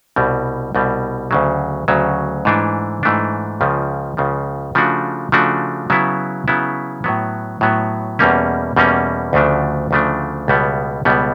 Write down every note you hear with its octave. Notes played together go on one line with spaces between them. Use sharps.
C2 B2 G3
C2 B2 G3
D2 C#3 F#3
D2 C#3 F#3
G#2 E3 A3 D4
G#2 E3 A3 D4
C#2 C#3 F3
C#2 C#3 F3
C#3 F3 A3 D4 F#4
C#3 F3 A3 D4 F#4
C#3 F#3 B3 E4
C#3 F#3 B3 E4
A2 F#3 B3
A2 F#3 B3
E2 B2 G3 A#3 C#4
E2 B2 G3 A#3 C#4
D2 C#3 F3 A3 D4
D2 C#3 F3 A3 D4
C#2 B2 G3 B3
C#2 B2 G3 B3